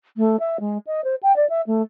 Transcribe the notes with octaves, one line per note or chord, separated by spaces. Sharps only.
A3
E5
G#3
D#5
C5
G5
D5
E5
A3